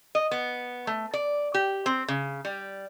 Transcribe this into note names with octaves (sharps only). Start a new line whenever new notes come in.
D#5
B3
A3
D5
G4
C4
C#3
G3